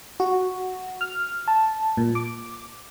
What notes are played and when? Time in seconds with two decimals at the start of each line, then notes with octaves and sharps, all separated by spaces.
0.20 F#4
1.01 F6
1.48 A5
1.97 A#2
2.15 D6